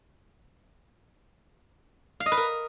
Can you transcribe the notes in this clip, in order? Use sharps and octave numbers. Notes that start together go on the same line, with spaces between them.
F5
D#5
B4
A#4